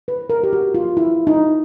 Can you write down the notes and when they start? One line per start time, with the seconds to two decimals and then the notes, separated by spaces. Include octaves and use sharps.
0.08 B4
0.30 A#4
0.43 G4
0.53 F#4
0.74 F4
0.97 E4
1.27 D#4